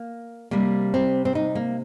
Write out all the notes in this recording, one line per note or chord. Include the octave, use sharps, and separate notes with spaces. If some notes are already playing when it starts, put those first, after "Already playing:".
Already playing: A#3
C3 G3 A#3
C4
C4
D#4
A#3